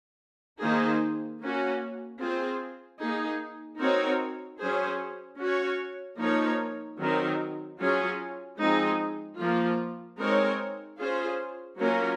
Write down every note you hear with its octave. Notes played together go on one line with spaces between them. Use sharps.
D#3 A#3 D#4 G#4 C5
A#3 C#4 F#4
C4 F4 G#4 C5
A#3 D#4 G#4
C4 D#4 F#4 A#4 C#5
F#3 C#4 G#4 C5
C#4 F#4 C#5
F3 A#3 D#4 A#4 C#5
D#3 F#3 C4 D#4 A#4
F#3 C#4 F4 G#4
F3 G#3 C4 D#4 G#4
F3 A#3 F4
G#3 C4 D#4 A#4 C#5
C#4 F4 G#4 C5
F#3 A#3 C#4 F4 A#4